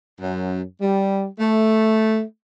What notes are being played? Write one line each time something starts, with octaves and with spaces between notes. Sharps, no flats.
F#2
G3
A3